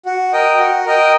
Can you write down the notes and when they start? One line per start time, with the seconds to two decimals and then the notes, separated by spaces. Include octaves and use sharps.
0.06 F#4
0.33 A#4 D#5 G5
0.59 F#4
0.86 A#4 D#5 G5